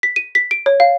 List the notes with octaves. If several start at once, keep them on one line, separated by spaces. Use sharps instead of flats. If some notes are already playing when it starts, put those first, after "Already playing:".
B6
D#7
B6
D7
C#5
F5